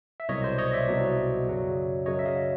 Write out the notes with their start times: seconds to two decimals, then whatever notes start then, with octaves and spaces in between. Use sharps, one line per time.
0.20 E5
0.29 C2 B2 F#3 C#5 D#5
0.44 C5 D5
0.58 C#5 D#5
0.73 D5 E5
0.88 C2 B2 F#3
1.47 F#2 C#3 F#3
2.06 F#2 C#3 F#3 C#5 D#5
2.19 E5
2.25 D#5 F5